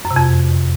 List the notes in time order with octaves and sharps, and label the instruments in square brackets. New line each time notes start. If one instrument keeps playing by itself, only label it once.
[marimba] F#2
C3
F2